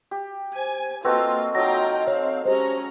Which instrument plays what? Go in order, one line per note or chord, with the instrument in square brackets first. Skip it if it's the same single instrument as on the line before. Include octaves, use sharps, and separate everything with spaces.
[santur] G4
[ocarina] C5 [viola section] G#5
[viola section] A#3 F4 [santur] C4 F#4 A4 [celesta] B4 C6 [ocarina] D#5
[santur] F#3 D#4 A4 [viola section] F4 G5 A#5 [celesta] A#6
[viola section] C4 F5 [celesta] C#5
[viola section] G#3 C#4 A#5 [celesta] G4 C5